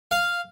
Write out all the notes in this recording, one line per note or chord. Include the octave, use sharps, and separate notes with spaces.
F5